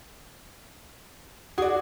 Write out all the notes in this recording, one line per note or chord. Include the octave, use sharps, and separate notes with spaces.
F#4 G#4 D5